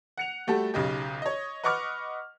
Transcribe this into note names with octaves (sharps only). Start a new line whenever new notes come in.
F#5 C#7 F7
G3 A3 F#4 G4 A4
B1 C#3 D#4 G4
C#5 D#5
B4 D#5 F#5 C#6 D6 F6